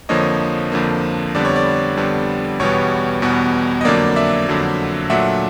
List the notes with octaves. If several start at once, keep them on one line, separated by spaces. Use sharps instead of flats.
F2 D3 F3 A#3 C#5 D#5
F2 D3 F3 A#3
F2 D3 G3 B3 D5
C#5
D5
F2 D3 G3 B3
E2 B2 G3 B3 C#5
E2 B2 G3 B3
D#5
F2 D3 F#3 A#3 D5
D5 E5
F2 D3 F#3 A#3
A#2 F#3 A3 D4 E5 F#5